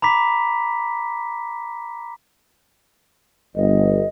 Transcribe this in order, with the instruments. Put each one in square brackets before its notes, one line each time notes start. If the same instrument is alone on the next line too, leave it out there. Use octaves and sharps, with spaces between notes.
[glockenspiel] A#5 B5 D6 B6
[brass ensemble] G1 [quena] D#5